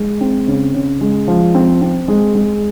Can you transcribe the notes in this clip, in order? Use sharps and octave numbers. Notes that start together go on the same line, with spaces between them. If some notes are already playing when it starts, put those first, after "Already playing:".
Already playing: G#3
C4
C#3
C#3
G#3
F3
C4
C4
G#3
G#3